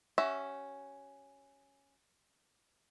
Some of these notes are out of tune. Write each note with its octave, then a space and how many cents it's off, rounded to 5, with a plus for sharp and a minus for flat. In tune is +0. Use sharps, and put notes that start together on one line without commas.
C#4 +0 F#4 +30 E5 +0